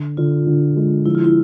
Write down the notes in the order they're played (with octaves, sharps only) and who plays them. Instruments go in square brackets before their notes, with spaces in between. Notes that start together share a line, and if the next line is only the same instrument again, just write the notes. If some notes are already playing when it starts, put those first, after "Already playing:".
Already playing: [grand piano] D3
[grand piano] D3 [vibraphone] F4
[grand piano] D3
G#3
[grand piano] F3 [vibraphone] E4
[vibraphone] F4
E4